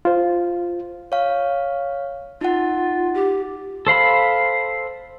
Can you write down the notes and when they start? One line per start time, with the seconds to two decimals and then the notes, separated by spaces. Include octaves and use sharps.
0.05 F4 C5
1.12 C#5 F5
2.41 D#4 F4 F#5
3.14 G4
3.87 A4 C5 F5 B5